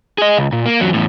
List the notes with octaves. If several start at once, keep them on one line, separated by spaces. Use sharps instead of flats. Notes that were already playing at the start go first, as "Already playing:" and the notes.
G#4 D#5
C#2
A#2
A#3
E2 F#3
E2 A2